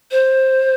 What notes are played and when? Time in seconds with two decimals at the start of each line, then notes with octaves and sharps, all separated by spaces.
0.11 C5